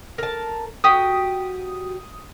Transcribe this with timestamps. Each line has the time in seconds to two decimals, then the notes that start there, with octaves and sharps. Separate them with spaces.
0.18 A#4 A5
0.84 F#4 G4 D#6